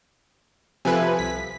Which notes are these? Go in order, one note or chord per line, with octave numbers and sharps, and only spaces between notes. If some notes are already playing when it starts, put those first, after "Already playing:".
C3 F3 A4 B4 E5 G#5
C2 B6